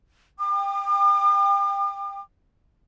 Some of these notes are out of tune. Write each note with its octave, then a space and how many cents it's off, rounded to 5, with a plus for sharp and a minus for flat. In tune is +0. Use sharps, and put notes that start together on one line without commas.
G5 +20 D6 +45